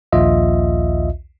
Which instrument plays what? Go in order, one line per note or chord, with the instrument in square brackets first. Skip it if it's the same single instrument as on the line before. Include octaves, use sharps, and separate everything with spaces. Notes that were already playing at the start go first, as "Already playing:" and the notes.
[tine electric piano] A#1 D#2 F4 D#5 E5